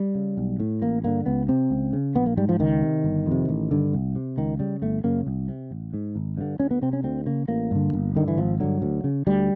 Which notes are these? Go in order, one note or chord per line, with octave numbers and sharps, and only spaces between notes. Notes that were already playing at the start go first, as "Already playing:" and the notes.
Already playing: G3
C#3
B1
A2
A1 A#3
G2 D3 A#3
C#2 B3
C3 C4
C#2
C#3
A#1 B3
A#3
G#2 G3
F3
C#2 D#3
C3
G1
F2
C3
A1
G2 D3
C2
C3
C#2 D#3
C#3 G3
G1 A3
F#2 C#3 A#3
C2
C3
A1
G#2
G#1
G2 D3
D2 C#4
B3
C3 C4
C#4
D2 C4
C#3 A#3
A1 A#3
G2 D3
G1
G2 D3 D#3
E3
G#1 F3
G2 D3 F#3
D2
C#3
D2 G3